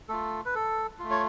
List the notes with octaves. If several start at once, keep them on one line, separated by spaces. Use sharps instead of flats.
A3 F4 A4
B4
A4
A3 F4
C#5